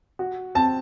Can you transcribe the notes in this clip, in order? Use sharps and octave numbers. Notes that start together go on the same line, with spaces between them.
F#4
C4 A5